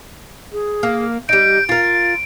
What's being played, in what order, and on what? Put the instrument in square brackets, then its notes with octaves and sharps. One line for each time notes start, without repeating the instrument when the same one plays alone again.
[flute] G#4
[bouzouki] A#3
[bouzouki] G3 D#4 [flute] G6 [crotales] D7
[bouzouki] F4 A#4 [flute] A6